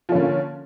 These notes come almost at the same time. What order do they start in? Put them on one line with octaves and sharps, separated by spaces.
F3 C#4 D3 A#3